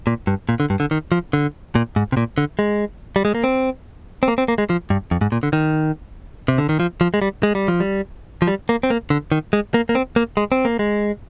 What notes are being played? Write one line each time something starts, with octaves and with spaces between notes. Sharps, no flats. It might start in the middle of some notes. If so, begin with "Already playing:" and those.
A#2
G2
A#2
D3
G2
D3
D#3
F3
D3
A#2
G#2
C3
A#2
D3
G#3
G3
G#3
A#3
C4
C4
A#3
C4
A#3
G#3
F3
G2
F2
G#2
A#2
D3
D#3
C3
D3
D#3
F3
F3
G#3
G3
G#3
G3
F3
G3
F3
G3
A#3
C4
A#3
D3
D#3
G#3
A#3
A#3
C4
A#3
G#3
C4
A#3
G#3